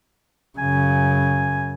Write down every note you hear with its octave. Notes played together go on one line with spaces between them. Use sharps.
F#2 C#3 G#5